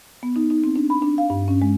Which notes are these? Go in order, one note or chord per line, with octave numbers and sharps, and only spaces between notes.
B3
D#4
D#4
C4
D4
B5
D4
F5
G2
C#4
G#3